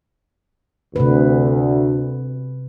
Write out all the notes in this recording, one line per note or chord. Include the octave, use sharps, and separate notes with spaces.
D2 C3 B4